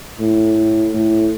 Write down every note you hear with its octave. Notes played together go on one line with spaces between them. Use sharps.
A2
A2